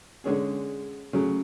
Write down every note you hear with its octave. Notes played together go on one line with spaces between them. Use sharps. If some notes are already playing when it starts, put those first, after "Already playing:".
D3 G#3 C#4 G#4
C#3 F#3 A3